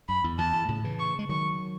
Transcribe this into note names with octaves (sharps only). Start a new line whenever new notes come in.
F#2 B5
E2
E2 A5
E2
A2 C#3
C#3 E3
C#6
G#3
D#3 F#3 C#6